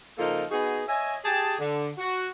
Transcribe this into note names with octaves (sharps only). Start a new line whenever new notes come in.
C#3 F3 A#3 D#4 F4 A4
B3 D#4 F#4 G#4
C#5 D#5 E5 G#5
G4 G#4 A5
D3
F#4